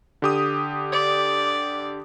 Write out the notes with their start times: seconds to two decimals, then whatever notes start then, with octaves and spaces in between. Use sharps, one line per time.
0.22 D3 G4 D#6
0.92 D5